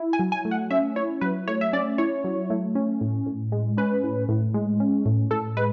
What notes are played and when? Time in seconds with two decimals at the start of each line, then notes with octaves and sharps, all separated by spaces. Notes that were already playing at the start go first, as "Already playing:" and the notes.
Already playing: E4
0.13 G#5
0.19 F#3
0.32 G#5
0.45 A3
0.51 F#5
0.71 C#4 E5
0.96 E4 C#5
1.21 F#3 B4
1.47 A3 C#5
1.61 E5
1.73 C#4 D5
1.98 E4 C#5
2.24 F#3
2.50 A3
2.75 C#4
3.01 A2
3.26 A2
3.52 G#3
3.77 C#4 B4
4.04 A2
4.29 A2
4.54 G#3
4.80 C#4
5.06 A2
5.31 A2 A4
5.57 G#3 B4